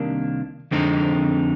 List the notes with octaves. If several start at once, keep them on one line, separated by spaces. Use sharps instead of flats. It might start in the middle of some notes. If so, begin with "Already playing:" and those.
Already playing: C2 C3 D#3 A#3 D4
F2 D3 G#3 C4 D#4